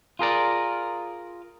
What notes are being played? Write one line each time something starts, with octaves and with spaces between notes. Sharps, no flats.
F4 G#4 A#4 D5